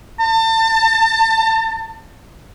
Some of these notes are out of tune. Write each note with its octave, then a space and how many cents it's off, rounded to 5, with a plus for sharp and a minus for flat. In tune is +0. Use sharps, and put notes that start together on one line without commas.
A5 +35